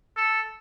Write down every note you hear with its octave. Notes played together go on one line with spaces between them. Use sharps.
A4